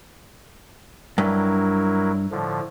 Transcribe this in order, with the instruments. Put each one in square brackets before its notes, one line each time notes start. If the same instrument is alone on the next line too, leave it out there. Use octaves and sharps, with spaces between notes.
[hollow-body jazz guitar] G2 [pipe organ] F#3 E4 A#4
[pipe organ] A2 D3 F3